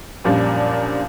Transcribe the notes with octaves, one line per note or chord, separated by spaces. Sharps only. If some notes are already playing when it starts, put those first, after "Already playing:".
F#2 A#2 F3 G3 D4